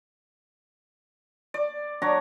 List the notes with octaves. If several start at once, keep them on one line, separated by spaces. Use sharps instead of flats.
D5
F#3 D4 C#5 A#5